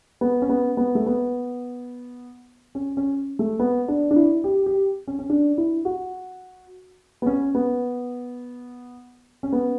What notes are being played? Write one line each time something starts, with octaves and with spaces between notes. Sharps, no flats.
B3
C#4
B3
B3
A3
B3
C#4
C#4
A3
B3
D4
D4
E4
G4
G4
C#4
C#4
D4
E4
F#4
B3
C#4
B3
C#4
B3